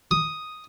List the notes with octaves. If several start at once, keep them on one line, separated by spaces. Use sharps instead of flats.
D#6